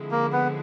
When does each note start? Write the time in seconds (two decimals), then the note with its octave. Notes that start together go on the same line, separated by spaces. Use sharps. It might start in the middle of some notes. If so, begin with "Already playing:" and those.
Already playing: D3 F3 G#3 C4 E4
0.11 A#3
0.33 B3